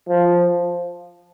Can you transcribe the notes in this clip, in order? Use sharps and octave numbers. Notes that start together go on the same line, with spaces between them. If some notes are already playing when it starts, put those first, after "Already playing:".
F3